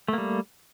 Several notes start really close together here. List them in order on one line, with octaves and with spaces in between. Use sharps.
A3 A#3 G3